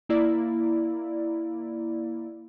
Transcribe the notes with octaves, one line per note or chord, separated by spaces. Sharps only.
A#3 E4 D5